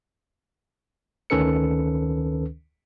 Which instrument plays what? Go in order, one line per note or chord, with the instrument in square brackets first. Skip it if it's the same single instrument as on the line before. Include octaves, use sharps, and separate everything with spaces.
[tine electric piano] D2 D#3 C#4 A4 B4 C#7